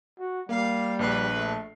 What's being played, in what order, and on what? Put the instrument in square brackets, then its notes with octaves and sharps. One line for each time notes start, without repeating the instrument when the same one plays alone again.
[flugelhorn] F#4
[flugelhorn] G3 [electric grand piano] A#3 [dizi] F5
[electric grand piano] A#1 F6 C7 [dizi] B4
[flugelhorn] A3